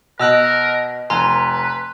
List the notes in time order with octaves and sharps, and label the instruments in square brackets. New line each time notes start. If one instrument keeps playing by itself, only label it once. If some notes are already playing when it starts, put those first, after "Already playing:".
[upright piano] B2 [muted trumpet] A#4 [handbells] D#5 E6 F#6
[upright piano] F1 [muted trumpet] B4 [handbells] G#5 A#5 C6